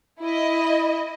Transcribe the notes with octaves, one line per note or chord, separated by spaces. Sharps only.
E4 D#5